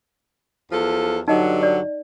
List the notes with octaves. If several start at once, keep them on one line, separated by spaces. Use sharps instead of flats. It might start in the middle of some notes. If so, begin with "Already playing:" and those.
E2 F3 A4
G2 D3 F#3 D#4 D#5
D5